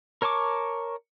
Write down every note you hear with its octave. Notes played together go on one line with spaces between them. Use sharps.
A#4 C#5 A5 C#6 D6